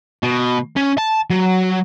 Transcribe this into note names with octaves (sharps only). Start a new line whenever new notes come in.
B2
C#4
A5
F#3